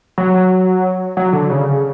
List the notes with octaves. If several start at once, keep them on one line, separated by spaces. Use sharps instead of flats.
F#3
F#3
D3
C#3